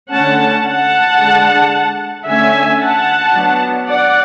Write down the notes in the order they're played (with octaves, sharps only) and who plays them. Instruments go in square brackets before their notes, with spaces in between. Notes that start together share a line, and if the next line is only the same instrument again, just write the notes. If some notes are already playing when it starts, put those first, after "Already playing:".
[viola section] D3 A3 C#4 F#5 A5
F#5 A5
D3 G#3 D4
D3 A3 C#4 E5 G#5
F#5 A5
F#3 B3 D4
D5 F#5